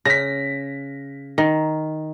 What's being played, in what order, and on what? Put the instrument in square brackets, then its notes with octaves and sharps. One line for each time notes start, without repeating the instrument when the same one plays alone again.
[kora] C#3 [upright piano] A#6 B6
[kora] D#3